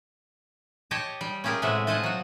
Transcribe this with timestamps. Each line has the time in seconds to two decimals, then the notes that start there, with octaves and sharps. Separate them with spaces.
0.91 G4 C#5 D#5 G5 A5
1.21 G3
1.44 C#4 F4 G4 G#4 A#4
1.62 A2 C3 G#3 E5 F#5 G#5
1.87 F4 C5 D#5 F#5 G#5 A5
2.03 F#3 F#4